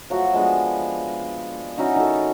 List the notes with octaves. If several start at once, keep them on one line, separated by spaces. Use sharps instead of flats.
F3 F#3 A3 F#4
F3 G#3 B3 D4
C#4 D#4 E4 F#4
D#3 F#4 A4